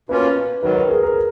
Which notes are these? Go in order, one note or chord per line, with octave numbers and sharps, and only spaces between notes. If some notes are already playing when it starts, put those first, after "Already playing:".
B2 A#3 C#4 F4 B4
G#2 D#3 F#3 B4
A#4
G#4
A#4